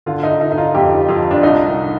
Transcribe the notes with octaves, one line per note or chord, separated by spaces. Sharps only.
D3 F4
D#4
D3 D#4
D#4
F4
F2 G4
F2 F4
D4
C2 D#4